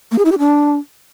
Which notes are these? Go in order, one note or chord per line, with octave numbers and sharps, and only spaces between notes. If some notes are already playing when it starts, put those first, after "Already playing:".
A#3
G#4
E4
G4
D4